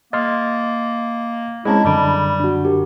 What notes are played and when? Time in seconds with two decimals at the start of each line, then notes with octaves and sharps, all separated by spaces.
0.13 A#3 D#5 C6 F6 A6
1.65 G#3 C4 C#4 E4 D#5 A5 A#5
1.84 F#2 D3 G3 B5 D6 D7
2.40 D4 F#4
2.65 G4 A#4